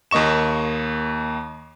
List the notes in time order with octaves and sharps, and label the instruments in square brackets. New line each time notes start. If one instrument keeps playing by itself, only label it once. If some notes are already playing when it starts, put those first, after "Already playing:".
[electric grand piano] D#2 A#3 D#5 C#6 E7